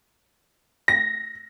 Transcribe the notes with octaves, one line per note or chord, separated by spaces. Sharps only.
A#6